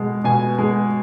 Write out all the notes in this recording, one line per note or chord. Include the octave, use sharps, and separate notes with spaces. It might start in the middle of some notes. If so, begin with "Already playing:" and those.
Already playing: B2 G#3
B2 G#5
G#3